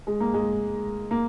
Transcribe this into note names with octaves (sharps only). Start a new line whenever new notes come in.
G#3
A#3
G#3
A#3